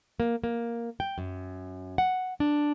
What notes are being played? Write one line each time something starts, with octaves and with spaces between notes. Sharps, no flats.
A#3
A#3
G5
F#2
F#5
D4